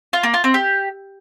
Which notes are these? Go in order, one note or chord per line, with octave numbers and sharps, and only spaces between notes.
F4
A#3
F4
C4
G4